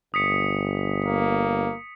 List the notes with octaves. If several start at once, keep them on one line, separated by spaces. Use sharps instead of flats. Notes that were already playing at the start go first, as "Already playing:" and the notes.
G1 D#6 B6 C#7
A#3